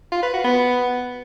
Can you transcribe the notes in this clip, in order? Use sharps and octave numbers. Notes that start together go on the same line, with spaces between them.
F4
B4
F#4
B3